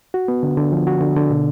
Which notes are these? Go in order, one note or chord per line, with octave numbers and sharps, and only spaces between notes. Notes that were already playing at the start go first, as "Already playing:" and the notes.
F#4
B3
D3
D3
F3
F#4
D3
D3
B2